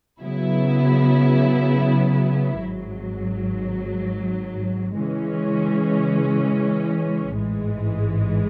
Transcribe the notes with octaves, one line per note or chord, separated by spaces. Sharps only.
C#3 F#3 B3 E4
G#1 G#2 F#3
C#3 E3 G#3 C#4
A1 G#2 E3 G#3